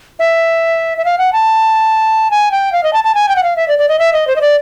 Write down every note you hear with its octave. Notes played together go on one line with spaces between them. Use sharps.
E5
E5
F5
F#5
A5
G#5
G5
F5
D#5
A5
A5
G#5
G5
F#5
F5
E5
D5
D5
D#5
E5
D#5
C5
D#5
D5